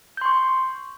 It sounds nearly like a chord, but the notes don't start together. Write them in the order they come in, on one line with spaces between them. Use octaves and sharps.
G6 C6 C#6